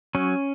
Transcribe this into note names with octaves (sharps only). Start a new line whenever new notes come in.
F#3 C#4